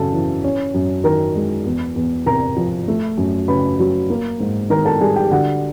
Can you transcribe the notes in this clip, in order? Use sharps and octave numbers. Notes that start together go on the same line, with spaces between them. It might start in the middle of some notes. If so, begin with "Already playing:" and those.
Already playing: F#2 C#3 A4 A5
E3
C#4
F#2
D#3 A#4 A#5
G#3
E2
E2
C3 A#4 A#5
F3
A3
F#2
C#3 B4 B5
F#3
A#3
G#2
D#3 A#4 A#5
A4 A5
G3 G#4 G#5
G4 G5
D3 F#4 F#5